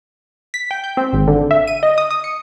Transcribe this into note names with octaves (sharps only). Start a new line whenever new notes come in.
B6
G5
G6
C4
G#1
D3
E5
D#7
D#5
D#6
D#6
C#7